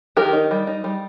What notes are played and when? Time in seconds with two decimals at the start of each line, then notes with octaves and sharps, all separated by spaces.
0.17 D#3 G4 A#4
0.33 D#4
0.51 G3
0.67 D#4
0.84 G3